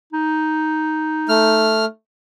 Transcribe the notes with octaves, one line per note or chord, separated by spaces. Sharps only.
D#4
A3 F6